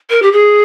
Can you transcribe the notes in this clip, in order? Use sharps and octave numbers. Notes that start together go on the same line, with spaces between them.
A#4
G4
G#4